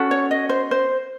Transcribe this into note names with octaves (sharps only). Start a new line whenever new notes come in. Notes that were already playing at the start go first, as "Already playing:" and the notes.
Already playing: C#4 F#4 A4
C#5
D#5
C5
C5